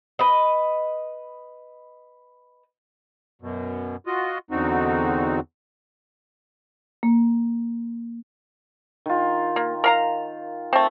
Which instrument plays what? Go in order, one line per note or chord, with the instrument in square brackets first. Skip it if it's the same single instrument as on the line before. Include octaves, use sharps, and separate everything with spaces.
[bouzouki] B4 D#5
[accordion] F#2 B2
F4 F#4 D#5
E2 D3 C4 D#4 F#4
[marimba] A#3
[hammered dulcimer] D#3 F4
[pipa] A#3
A#4 F5 A#5
A3 C4